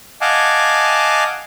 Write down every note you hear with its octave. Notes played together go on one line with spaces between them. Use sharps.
D#5 F5 F#5 G#5 A5 D6